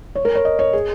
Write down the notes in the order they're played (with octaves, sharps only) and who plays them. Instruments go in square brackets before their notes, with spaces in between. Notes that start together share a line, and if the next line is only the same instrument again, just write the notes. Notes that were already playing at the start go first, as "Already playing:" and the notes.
[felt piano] C#5
A#4
C#5
D#5
C#5
G#4